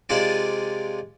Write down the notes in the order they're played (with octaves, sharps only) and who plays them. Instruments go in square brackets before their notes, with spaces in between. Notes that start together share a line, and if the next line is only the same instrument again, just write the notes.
[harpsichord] C3 G#3 F4 D5